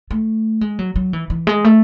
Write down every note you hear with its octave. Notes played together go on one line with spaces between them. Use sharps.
A3
G#3
F#3
F#3
E3
E3
G#3
A3